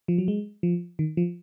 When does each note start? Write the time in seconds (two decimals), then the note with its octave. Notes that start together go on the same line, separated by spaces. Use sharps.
0.08 F3
0.18 F#3
0.28 G#3
0.63 F3
0.99 D#3
1.17 F3